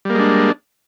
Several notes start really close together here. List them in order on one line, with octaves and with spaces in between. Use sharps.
G3 A#3 G#3 D4